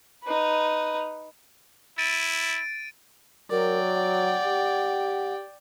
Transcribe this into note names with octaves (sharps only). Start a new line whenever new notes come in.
D#4 B4
E4 A6 D7 D#7
F#3 A#4 D5 G5
F#5
G4